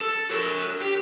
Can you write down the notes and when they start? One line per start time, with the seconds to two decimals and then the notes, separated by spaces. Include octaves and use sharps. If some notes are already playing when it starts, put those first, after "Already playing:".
0.01 A4
0.31 A#4 C#5
0.81 G4